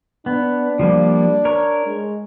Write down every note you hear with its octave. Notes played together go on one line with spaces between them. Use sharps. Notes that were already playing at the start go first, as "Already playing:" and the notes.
B3 D4
F3 G3 A#3
A#4 C#5
G#3